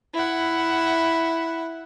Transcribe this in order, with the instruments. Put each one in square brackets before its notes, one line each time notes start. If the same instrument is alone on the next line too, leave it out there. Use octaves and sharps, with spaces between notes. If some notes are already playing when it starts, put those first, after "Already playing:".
[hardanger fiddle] E4 F#5